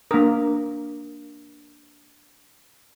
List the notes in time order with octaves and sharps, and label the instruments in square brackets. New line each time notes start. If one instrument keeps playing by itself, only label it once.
[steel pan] A#3 A#4 [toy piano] D4 A4 D#6